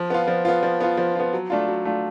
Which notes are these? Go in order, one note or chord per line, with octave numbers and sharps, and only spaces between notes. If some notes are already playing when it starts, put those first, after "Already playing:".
Already playing: F3
B3 F4
F3
B3 F4
F3
B3 F4
F3
B3 F4
F#3
A3 D4 F4
F#3
A3 D4 F4